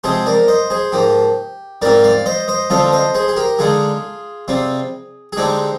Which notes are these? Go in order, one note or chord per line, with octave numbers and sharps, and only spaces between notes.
C3 F3 G#3 G#4 C5
A#4 D5
C5 D#5
G#4 C5
G#2 F3 A#3 G4
G#2 G3 C4 F4 A#4 D5
D5 F5
C5 D#5
C5 D#5
D3 F3 C4 F4 C5 D#5
C5 D#5
G#4 C5
G#4
G4 A#4
D3 G#3 D#4 F4 G#4
C3 G3 C4 F4
G#4
D3 G#3 C4 D#4 G4